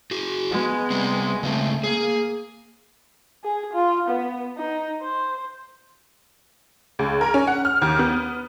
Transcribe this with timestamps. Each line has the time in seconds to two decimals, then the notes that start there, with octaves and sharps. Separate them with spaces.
0.11 F#4 G#4
0.51 G#3 B3
0.91 G3 C4
1.43 C#3 G#3 A3 C4
1.84 A#3 G#4
3.44 G#4
3.73 F4
4.09 B3
4.57 D#4
5.01 C5
6.99 C#2
7.21 A#4
7.34 C#4
7.47 F#5
7.65 F6
7.82 D#2
7.99 B3